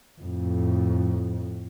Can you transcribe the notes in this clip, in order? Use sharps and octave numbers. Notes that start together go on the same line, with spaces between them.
F2 A2